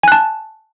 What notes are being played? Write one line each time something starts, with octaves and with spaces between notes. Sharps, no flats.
G#5 A5 F#6